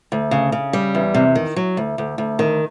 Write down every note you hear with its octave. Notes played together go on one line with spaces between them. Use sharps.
D2
C#3
C#3
G3
E2
C3
D#3
F#3
D2
D2
D2
D#3